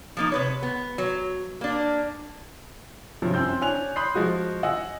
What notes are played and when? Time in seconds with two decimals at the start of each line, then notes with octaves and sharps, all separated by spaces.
0.17 F3 A#3 D#4
0.32 C3 B4 C#5
0.63 B3
0.98 F#3
1.61 A#3 D4
3.22 G2 C3 F3 F#3
3.34 F#2 C4 E6 G6
3.61 C#4 D4 G#5 F#6 F7
3.96 B5 C6 D#6 F#6 G6 C7
4.15 F3 G#3 F#4 D#6
4.63 D#5 F#5 G#5 E6